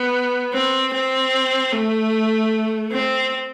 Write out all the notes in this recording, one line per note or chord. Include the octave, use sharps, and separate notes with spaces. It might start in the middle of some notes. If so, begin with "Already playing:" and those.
Already playing: B3
C4
C4
A3
C4